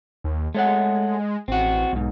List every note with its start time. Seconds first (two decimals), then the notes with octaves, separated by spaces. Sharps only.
0.24 D#2
0.55 G#3 A3 C#5 F#5
1.48 A1 C4 F#4
1.93 B1 E2 G#2